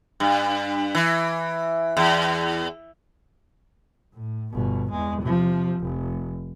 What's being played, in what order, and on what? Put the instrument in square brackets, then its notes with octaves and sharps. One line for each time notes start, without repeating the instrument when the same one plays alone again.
[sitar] G2
E3
E2
[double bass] A2
G1 B2
E2 G#3
C3 F3
F1